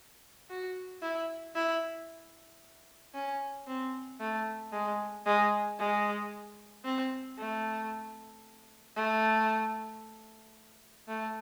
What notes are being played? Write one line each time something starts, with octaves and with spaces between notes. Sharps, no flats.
F#4
E4
E4
C#4
C4
A3
G#3
G#3
G#3
C4
A3
A3
A3